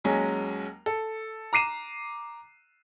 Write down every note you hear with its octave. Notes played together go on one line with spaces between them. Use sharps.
D#2 F#3 G#3 C#4
A4
A#5 D6 C7 D#7 E7